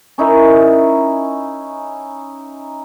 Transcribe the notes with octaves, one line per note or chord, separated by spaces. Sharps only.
C#4 D#4 E4 A#4